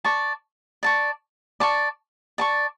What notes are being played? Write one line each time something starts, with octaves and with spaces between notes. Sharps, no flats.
D5 A5 C#6
D5 A5 C#6
D5 A5 C#6
D5 A5 C#6